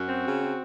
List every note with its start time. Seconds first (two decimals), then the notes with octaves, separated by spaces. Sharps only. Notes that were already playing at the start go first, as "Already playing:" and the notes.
Already playing: F#2 F#4
0.09 C4
0.26 C#3
0.43 C4